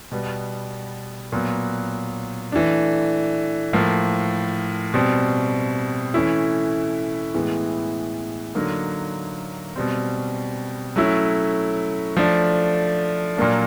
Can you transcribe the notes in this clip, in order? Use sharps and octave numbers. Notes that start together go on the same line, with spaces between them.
B2 G3 B3
A#2 F#3 B3
E3 A3 D4
A2 F3 A#3
B2 G3 C4
E3 A3 C#4 E4
A2 E3 G#3 B3
D3 F#3 A#3 D#4
B2 G3 C4
F#3 A3 C#4 E4
F3 A3 D4
A#2 F#3 A#3 D4